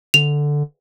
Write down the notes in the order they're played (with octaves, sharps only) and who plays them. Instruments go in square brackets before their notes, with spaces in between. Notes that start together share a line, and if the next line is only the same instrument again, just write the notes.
[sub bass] D3 [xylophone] F7